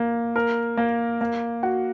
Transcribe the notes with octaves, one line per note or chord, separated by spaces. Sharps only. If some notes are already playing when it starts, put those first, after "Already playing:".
Already playing: A#3
A#4
A#3
A#3
F#4